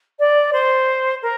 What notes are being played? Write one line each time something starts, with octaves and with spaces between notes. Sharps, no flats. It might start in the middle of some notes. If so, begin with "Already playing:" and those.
D5
C5
A#4